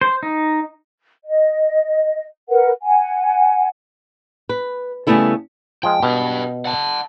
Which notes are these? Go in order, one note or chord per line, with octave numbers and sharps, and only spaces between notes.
C5
D#4
D#5
A#4 B4 F#5
F#5 G#5
B4
C#3 G3 A3 B3 E4 A4
F3 G#3 G5
B2 G4 B4
F#5 A5